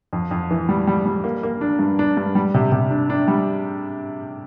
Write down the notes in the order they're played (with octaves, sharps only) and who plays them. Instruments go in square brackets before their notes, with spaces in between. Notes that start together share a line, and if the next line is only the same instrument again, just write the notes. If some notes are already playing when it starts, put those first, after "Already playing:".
[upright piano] F2
F2
E3
G3
G3
G3
A#3
A#3
D4
G2
D4
G2
G3
C3
C3
D4
D4
G3